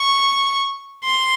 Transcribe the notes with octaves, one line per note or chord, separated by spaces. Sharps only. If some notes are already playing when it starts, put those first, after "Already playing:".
Already playing: C#6
C6